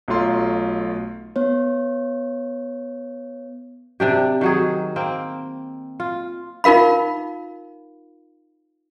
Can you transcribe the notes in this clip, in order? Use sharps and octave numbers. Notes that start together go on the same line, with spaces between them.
B1 F#3 A3 F4 C6
B3 C#5
C3 D4 G4
D#3 F#3 G#4
A#3 C4
F4
D#4 F4 A#4 F5 B5